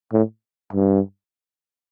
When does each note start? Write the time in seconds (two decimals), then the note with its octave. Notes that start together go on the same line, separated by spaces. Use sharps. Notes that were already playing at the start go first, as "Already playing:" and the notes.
0.13 A2
0.73 G2